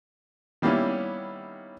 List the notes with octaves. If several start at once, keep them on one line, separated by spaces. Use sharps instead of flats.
D#3 G3 A#3 B3 C#4 E4